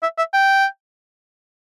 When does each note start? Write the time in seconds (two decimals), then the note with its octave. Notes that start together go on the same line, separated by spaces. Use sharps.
0.03 E5
0.18 E5
0.33 G5